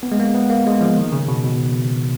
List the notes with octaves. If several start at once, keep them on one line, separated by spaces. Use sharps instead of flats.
B3
G#3
A#3
B3
A#3
G#3
F3
D#3
C#3
B2
B2